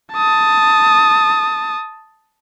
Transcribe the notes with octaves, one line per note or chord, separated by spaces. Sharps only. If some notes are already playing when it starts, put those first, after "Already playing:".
A5 D#6